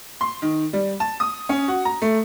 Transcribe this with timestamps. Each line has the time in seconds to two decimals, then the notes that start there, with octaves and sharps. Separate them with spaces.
0.21 C6
0.42 D#3
0.73 G3
1.00 A5
1.20 D#6
1.49 C#4
1.68 F#4
1.85 A#5
2.02 A3